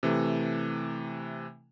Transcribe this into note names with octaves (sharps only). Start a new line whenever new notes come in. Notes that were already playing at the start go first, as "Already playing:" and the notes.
C3 E3 A3